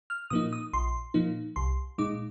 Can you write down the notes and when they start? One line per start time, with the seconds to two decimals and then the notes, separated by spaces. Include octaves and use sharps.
0.10 F6
0.30 A#2 F3 A#3 D#4 D#6
0.53 D#6
0.73 A#1 C6
1.14 A#2 F3 A#3 D#4
1.56 C2 C6
1.98 A#2 G#3 D#4 D6